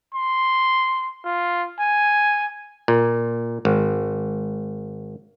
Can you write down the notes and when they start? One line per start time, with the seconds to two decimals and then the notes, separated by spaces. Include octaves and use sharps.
0.15 C6
1.25 F4
1.79 G#5
2.88 A#2
3.65 G#1